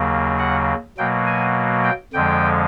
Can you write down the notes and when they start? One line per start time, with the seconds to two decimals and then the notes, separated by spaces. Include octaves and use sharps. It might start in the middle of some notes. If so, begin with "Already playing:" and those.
Already playing: D#2 C#3 F#3 A#3
0.39 F#5
0.98 B2 F#3 A#3 G5
1.26 G#5
1.84 G5
2.13 F2 D3 F3 G#3 G5